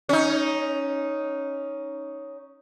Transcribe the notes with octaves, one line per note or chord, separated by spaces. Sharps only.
C#4 D#4